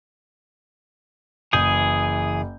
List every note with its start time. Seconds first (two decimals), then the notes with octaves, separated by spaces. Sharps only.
1.53 F#1 E3 G#4 D#6 G6